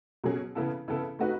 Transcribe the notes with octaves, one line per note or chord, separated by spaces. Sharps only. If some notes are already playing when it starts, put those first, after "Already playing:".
B2 F#3 C#4 G#4
C#3 E3 B3 E4 A4
C#3 E3 B3 E4 A4
A3 D#4 F#4 B4